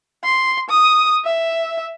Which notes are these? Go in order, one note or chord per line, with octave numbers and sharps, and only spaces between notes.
C6
D#6
E5